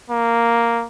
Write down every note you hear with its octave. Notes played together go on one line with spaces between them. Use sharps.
A#3